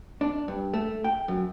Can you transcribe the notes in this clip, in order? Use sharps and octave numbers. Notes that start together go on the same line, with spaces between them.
D4
G2
A3
G5
F#2